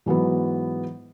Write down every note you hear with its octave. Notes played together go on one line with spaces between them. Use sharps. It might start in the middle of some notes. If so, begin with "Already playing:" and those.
G#2 E3 F#3 B3